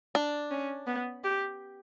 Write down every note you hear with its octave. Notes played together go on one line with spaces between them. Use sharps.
D4
C#4
B3
G4